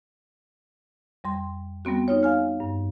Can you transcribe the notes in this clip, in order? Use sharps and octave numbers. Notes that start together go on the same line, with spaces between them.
F2 G3 C6
G3 B3 C4 F#4
D#4 F4 C#5
F5 G#5 F6
G2